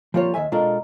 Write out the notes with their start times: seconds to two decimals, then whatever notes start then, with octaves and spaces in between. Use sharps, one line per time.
0.14 F3 G3 A#3 F4 C#5
0.34 D#2 C3 D#3 E5 G#5
0.52 B2 G#3 D4 F4 A4 A#4